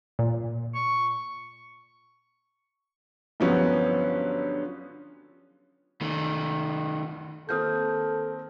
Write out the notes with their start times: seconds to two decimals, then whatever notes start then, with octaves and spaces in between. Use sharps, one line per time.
0.19 A#2
0.75 C#6
3.40 G2 D3 F3 F#3 B3 C#4
6.01 D#3 A3
7.49 D#3 A#3 C4 A4 D#6 F6 G6